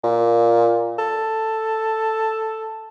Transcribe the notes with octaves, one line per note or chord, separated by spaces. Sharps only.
A#2
A4